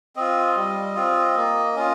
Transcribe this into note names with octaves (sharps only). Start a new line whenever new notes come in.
C4 F4 D#5
G3
C4 F4
A#3
C#4 F4